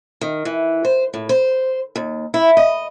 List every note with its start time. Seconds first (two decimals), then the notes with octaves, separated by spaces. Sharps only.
0.21 D#3
0.45 E3
0.85 C5
1.14 A2
1.29 C5
1.96 D#2
2.34 E4
2.57 D#5